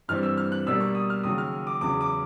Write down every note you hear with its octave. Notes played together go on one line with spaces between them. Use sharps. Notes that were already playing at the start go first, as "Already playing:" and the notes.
G2 E3 G3 C4 F6
E6
F6
F#6
B2 G3 A#3 D4 E6
C#6
D#6
F6
D#2 C#3 F#3 D#6
F6
D6
E2 C#3 F#3 D6
D6